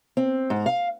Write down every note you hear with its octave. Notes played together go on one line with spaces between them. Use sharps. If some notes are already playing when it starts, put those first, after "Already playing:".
C4
G#2
F5